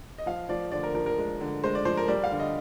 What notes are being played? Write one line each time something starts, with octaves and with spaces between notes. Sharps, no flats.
D#5
F3 F5
F3 D5
D3 D5
A#4
F3 A#4
A#4
G#3
D3
G#3 C5
D5
F3 C5
A#4
G3 D5
F5
D3
D#5